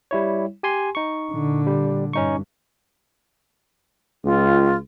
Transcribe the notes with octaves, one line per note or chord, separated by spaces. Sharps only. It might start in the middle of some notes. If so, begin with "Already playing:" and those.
G3 E4 C#5
G4 G#5 C6
D#4 C#6
A#2 D3
G3
G2 C#4 D#4 C#6
C#2 F4